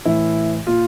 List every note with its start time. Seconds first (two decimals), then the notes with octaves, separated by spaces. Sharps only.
0.05 A2 E3 E4
0.67 A#2 F4